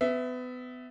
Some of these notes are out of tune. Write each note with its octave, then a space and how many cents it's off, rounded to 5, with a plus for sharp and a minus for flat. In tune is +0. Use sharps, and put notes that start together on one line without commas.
B3 +30 E5 +0